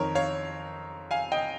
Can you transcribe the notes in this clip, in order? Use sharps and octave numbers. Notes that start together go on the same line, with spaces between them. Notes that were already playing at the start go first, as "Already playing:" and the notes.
Already playing: F2 D#3 A#4 C#5
C#5 F5
F5 G#5
D#5 G5